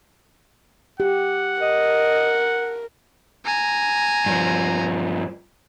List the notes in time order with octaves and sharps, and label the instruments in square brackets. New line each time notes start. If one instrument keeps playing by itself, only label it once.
[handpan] G4 [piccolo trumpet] F#5
[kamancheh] A#4 [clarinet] D#5
[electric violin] G#5 A#5
[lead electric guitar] G2 F3